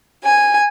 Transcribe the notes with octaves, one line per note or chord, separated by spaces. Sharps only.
G#5